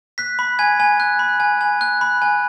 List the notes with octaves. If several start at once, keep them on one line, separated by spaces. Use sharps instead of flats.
F#6 B6
B5
G#5 G#6
G#5
F#6
B5
G#5
G#5
F#6
B5
G#5